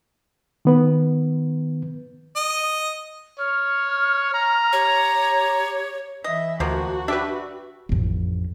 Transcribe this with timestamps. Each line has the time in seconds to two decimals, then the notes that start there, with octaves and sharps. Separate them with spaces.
0.65 D#3 B3 B4
2.36 D#5
3.39 C#5 F6
4.34 A#5
4.72 G4 C#5
6.24 E3 D#5 E5
6.60 D2 C3 F3 A#3 F#4
7.08 D4 G4 B4 E5
7.89 A1 F2